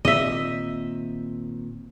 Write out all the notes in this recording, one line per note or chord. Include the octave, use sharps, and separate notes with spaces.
A#2 D#3 C4 D#5 E5